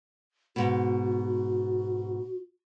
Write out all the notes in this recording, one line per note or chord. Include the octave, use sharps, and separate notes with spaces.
G#2 B2 F#4